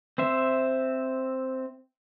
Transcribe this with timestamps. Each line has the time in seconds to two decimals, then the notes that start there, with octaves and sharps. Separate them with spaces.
0.18 C4 C5 E5